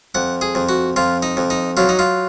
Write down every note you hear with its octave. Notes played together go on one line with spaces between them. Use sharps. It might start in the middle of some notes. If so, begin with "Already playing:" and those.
F2 F#5
G#4
F2
F#4
F2 F4
D#4
F2
D#4
F#3 F4
D#4
F4